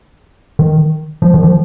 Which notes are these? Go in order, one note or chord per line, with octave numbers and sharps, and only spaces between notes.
D#3
F3
D#3
F3